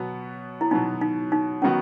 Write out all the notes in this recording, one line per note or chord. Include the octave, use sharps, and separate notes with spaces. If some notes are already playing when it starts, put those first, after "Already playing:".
Already playing: B2 F#3 B3
E4
B2 F#3 B3 D#4
D#4
D#4
D#3 F#3 B3 C#4 F#4